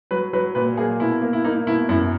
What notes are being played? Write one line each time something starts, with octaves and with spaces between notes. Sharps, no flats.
F#3 B4
F#3 B4
A#2 B4
A#3 G#4
B2 E4
A#3
E4
A#3 D#4
B2 E4
F#2 E4